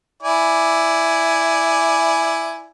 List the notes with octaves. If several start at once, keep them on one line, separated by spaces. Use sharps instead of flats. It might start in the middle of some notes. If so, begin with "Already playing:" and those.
E4 D5 G#5